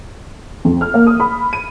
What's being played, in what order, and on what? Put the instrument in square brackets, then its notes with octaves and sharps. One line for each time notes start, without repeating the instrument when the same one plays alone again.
[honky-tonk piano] F2
F6
A#3
D#6
B5
D#7